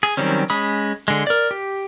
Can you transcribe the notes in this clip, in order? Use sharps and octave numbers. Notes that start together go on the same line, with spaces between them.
G#4
D#3 F#3 G3 C4 C#4
G#3 C#4 B5 D#6
D3 G#3
A#4 D5
G4